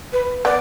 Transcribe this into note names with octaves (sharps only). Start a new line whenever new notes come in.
B4
B3 D5